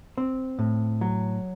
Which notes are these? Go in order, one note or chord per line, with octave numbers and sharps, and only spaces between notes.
C4
A2
F#3